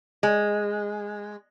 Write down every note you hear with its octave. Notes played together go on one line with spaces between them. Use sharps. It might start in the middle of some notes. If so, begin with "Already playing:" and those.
G#3